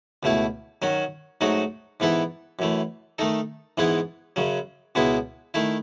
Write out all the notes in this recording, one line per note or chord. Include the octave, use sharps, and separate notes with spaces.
C#2 B2 A3 E4
D#3 F#3 C#4 F#4
G#2 F#3 A3 D#4 F#4
G#2 E3 B3 E4 A4
F#2 E3 A3
D#3 A3 D#4 A4
G#2 E3 G#3 B3 E4
F#2 C#3 F#3
C#2 B2 G#3 B3 E4
D#3 A3 E4